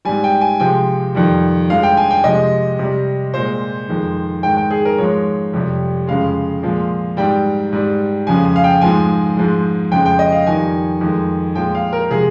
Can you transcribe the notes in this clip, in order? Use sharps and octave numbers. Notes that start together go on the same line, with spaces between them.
G#2 G3 G#5
G5
G#5
C3 F3 G#3 G5
F2 D#3 G3
G2 F3 G#3 F5
G5
G#5
G5
C3 F3 G#3 D#5
C3 G3
A#2 G#3 C5
F2 D#3 G#3
G#2 D#3 G#3 G5
G5
G#4
A#4
G#2 F3 G#3 C#5
F2 C3 G3
F2 C#3 G#3 F5
A#2 F3 G#3
G#2 G3 G5
G#2 G3
F2 C#3 F3 G#3 G#5
G#5
F5
G5
G#2 F3 G#3 G#5
G#2 F3 G#3
F2 C#3 G#3 G5
G5
D#5
F5
F2 D#3 G3 G#5
F2 D#3 G#3
A#2 F3 G#3 G5
F5
A#4
C3 F3 G#3 G#4